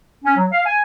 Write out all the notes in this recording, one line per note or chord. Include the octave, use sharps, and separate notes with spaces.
C#4
F#3
F5
G#5